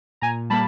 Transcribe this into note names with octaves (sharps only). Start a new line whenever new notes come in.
A#2 G#5 A#5
G3 A#3 A5 B5